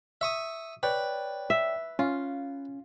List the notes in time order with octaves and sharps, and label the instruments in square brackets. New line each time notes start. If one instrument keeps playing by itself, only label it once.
[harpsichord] E5 C#6 D#6
[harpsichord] B4 [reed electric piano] C#5 D5 G5
[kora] E5
[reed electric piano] C#4 [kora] F4